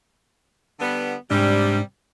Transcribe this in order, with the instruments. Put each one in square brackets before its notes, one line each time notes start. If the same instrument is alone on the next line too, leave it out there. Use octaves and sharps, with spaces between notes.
[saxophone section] D3 G3 B3
[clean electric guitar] G#2 D4 [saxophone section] C3 G3